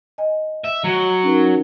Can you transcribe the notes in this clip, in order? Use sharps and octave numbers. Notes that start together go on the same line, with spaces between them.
D#5 G#5
E5
F#3
C#4 D#4 A#4